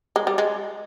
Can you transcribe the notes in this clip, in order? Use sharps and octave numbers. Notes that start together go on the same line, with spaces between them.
G#3
G3
G#3